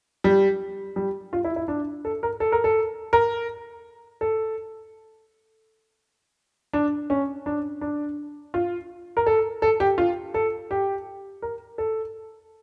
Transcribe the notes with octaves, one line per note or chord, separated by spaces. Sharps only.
G3
G3
F4
E4
E4
D4
A4
A#4
A4
A#4
A4
A#4
A4
D4
C#4
D4
D4
F4
A#4
A4
A4
G4
F4
A4
G4
A#4
A4